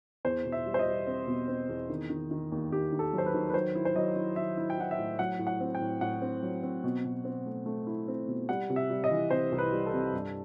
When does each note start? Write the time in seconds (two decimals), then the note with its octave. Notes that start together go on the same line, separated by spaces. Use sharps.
0.25 E2 C5
0.45 B2
0.52 E5
0.66 G3
0.74 C5
0.79 D#5
0.87 G3
1.07 C4
1.27 B2
1.48 C4
1.69 E2
1.90 D#3
2.09 D#3
2.31 D#3
2.52 D#2
2.72 D#2 G4
2.92 D#3
2.99 A4
3.13 F#3 C5
3.26 B4
3.34 D#3
3.50 B4
3.54 F#3 C5
3.75 E4
3.85 C5
3.96 F#3 D#5
4.16 E4
4.36 E4 E5
4.57 E4
4.70 G5
4.78 E4 F#5
4.91 E5
4.99 A2
5.19 F#3 F#5
5.39 A2
5.47 F#5
5.60 C4
5.75 G5
5.81 A2
6.01 A2 F#5
6.22 C4
6.43 F#3
6.63 C4
6.84 B2
7.05 B2
7.25 C4
7.46 A3
7.66 A3
7.87 E4
8.08 C4
8.28 B2
8.49 G3 F#5
8.70 C3
8.76 E5
8.90 G3
9.04 D#5
9.11 E3
9.31 C3 C5
9.52 C2
9.59 B4
9.73 G3
9.86 A4
9.94 C3
10.13 G2